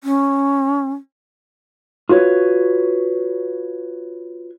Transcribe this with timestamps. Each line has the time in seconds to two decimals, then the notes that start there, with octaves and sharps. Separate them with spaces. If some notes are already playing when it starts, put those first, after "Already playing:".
0.04 C#4
2.09 F4 F#4 B4 C#5